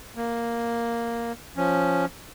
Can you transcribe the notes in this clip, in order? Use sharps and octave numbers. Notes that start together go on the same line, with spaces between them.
A#3
F3 C#4